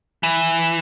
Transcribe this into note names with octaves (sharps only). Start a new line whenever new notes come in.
E3